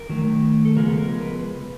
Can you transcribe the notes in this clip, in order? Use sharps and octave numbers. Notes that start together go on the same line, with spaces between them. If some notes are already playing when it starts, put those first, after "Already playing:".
Already playing: A#4
D#3 F#3 A3
A4
C#3 F3 G#3 B3 A#4
A#4
B4